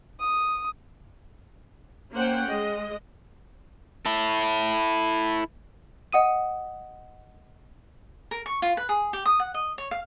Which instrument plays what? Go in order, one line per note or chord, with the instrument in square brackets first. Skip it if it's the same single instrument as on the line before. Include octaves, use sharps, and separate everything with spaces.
[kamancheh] D#6
[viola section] A#3 C#4 C5 F#5 G5
G#3 D#5
[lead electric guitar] E4 A4
[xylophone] D#5 F#5 D#6 D#7
[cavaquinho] A#4
C#6
F4
B4
G#4
G4
D#6
F#5
D#5
C#5
F5